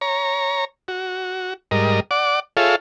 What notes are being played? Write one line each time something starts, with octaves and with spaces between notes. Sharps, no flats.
C#5 A#5
F#4
G#2 G3 A#4 D#5
D5 F#5 D6
F4 G#4 A4 C#5 E5 F5